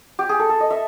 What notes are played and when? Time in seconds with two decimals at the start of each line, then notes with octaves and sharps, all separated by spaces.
0.19 G4
0.29 G#4
0.39 A4
0.49 A4
0.60 D#5
0.70 E5